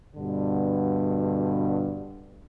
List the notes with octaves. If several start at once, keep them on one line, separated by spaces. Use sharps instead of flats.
G2 B2 D3